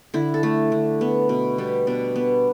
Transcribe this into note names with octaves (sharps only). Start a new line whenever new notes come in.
D3 E4
A4
A3
D3
B3
B2
G3 B3
B2 D4
B3